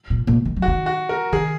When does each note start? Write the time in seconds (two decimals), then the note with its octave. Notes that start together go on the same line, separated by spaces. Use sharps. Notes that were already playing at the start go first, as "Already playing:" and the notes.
0.10 A#2
0.27 A#2
0.45 D#3
0.56 F#3
0.62 F#4
0.68 D#3
0.86 F#4
1.09 A#4
1.32 D#3 G#4